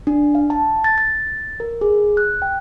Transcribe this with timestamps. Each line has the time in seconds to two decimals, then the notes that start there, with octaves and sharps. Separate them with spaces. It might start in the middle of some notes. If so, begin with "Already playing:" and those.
0.07 D4
0.35 F5
0.50 A5
0.84 A6
0.98 A6
1.60 A#4
1.81 G#4
2.17 F#6
2.42 G5